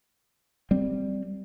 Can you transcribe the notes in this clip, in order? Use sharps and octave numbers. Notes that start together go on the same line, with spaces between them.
G3 C4